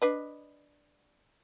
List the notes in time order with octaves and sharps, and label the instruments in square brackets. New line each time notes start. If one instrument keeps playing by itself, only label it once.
[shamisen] D4 B4 D#5